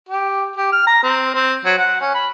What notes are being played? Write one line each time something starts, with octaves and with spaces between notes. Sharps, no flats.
G4
G4
F6
A#5
C4
C4
F#3
F#5
C#4
B5